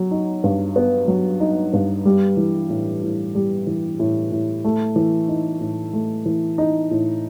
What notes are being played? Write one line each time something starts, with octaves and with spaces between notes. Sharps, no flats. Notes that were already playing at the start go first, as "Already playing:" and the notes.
Already playing: F#3
D#4
G2
B3
F#3
D#4
G2
G3
E3
A2
A2
G3
E3
A2
A2
A3
E3
D#4
A2
A3
E3
D#4
A2